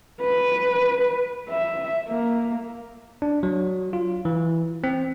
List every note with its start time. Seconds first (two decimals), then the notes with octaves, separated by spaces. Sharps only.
0.21 B4
1.49 E5
2.09 A#3
3.22 D4
3.43 F#3
3.93 F4
4.25 E3
4.84 C4